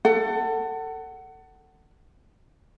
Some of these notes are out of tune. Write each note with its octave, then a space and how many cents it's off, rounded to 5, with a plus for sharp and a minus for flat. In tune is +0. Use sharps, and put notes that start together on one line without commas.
A4 +25 F#5 +25